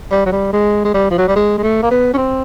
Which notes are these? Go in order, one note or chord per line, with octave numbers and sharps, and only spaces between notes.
G3
F#3
G3
G#3
G#3
G3
F3
F#3
G3
G#3
G#3
A3
A#3
B3
C#4
C4